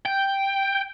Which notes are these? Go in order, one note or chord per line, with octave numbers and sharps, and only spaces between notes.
G5